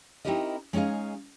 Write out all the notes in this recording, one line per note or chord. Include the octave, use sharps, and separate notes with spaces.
C4 D#4 E4 G4 A#4 D#5
G#3 C#4 D#4 G#4 F5